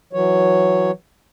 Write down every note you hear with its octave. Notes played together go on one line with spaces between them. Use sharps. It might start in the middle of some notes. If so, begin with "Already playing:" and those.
E3 F#3 C#5